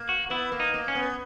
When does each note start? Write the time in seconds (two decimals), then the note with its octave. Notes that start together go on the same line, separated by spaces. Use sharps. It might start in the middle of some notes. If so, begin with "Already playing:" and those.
Already playing: A#3
0.09 F#4
0.30 B3 E4
0.52 A#3
0.60 D#4
0.74 A#3
0.88 C#4
0.95 B3